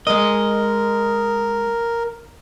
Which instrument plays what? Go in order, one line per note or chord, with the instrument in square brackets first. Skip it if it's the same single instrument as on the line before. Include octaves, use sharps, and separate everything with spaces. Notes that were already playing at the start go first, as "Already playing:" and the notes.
[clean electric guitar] G#3 D#5 [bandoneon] A#4